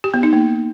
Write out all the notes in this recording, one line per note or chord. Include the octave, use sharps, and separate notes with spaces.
G4
B3
D#4
A#3